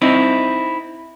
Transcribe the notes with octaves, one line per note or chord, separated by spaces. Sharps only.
C4 D#4 E4